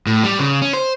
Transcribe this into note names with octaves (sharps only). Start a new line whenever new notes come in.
A2
G3
C#3
C#4
C5